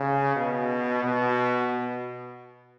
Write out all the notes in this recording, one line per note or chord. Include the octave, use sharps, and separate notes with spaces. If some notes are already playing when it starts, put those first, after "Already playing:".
Already playing: C#3
B2
B2